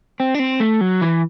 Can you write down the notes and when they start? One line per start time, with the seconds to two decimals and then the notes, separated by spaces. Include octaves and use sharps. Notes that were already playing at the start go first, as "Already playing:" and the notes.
0.20 C4
0.34 D4
0.39 C4
0.60 A3
0.81 F#3
1.01 E3